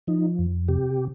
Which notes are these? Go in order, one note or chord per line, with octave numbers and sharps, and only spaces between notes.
F3 D#4
F2
C3 G4